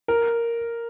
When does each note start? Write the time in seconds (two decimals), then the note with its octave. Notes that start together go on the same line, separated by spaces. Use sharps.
0.08 A#4